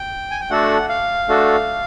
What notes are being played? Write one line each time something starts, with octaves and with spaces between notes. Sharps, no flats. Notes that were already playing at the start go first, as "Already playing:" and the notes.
Already playing: G5
G#5
G5
A3 D4 F#4 A4 F#5
F5
A3 D4 F#4 A4